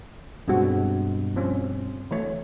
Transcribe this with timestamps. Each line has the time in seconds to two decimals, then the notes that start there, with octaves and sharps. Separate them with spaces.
0.48 G2 B2 G#3 C4 F#4
1.36 F3 C4 C#4
2.11 E3 A3 C#5